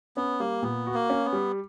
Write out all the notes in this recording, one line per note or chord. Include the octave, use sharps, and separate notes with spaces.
B3 C#4
G3 A#3
A#2 B3
F#4
A#3
C#4
B3
G3